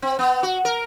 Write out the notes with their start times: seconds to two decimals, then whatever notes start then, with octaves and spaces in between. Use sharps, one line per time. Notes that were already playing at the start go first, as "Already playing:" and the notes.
0.02 C4
0.19 B3
0.43 F#4
0.65 A#4